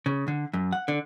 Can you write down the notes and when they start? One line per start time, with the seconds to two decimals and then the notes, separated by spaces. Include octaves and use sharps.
0.06 C#3
0.28 D3
0.53 F#2
0.73 F#5
0.88 D3